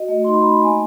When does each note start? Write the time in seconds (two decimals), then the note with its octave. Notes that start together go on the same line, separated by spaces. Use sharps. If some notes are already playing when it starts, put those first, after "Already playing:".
Already playing: F#4 D#5
0.08 A3
0.24 D#4 C6
0.34 B5
0.43 C4 A#5
0.52 A5
0.63 A#3 G#5